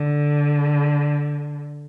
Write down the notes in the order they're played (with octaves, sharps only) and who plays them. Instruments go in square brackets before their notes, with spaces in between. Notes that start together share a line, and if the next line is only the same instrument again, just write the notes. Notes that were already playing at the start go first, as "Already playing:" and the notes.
Already playing: [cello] D3